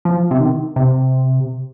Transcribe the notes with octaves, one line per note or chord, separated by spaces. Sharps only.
F3
C3
D#3
C3